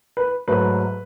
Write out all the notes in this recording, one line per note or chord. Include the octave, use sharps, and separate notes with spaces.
B4
G#2 F#3 A3 B4